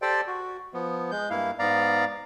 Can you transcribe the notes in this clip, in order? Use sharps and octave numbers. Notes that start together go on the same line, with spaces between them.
G4 A4 C5 D5 G5
F#4
F3 B3
G#3 G6
G2 A#3 E4 F5
G#2 B3 D5 F5 A#5